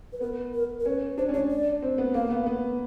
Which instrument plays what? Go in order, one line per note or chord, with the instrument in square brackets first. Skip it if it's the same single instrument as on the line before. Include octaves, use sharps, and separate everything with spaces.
[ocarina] B4
[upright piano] B3 [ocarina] A#4
[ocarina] A#4
A#4
[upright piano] C#4 [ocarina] B4
[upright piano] D4 [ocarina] C5
[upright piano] C#4
[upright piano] D4 [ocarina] C#5
[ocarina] D5
[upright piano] C4
B3
[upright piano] A#3 [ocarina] F5
[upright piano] B3
B3